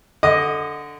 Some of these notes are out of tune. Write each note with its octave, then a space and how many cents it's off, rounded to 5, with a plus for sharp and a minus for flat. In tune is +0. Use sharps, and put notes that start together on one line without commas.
D3 +0 D#5 +5 D#6 -40